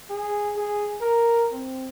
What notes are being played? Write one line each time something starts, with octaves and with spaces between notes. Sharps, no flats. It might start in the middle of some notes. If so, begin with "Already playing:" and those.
G#4
G#4
A#4
C4